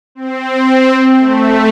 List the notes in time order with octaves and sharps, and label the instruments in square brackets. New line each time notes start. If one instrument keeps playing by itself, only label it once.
[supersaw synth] C4
A3